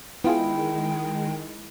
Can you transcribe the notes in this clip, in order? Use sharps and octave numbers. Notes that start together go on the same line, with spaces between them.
D#3 G#3 B3 E4 F4 G#4 G5